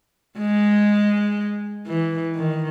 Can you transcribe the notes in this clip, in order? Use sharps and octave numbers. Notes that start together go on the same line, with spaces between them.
G#3
E3
D#3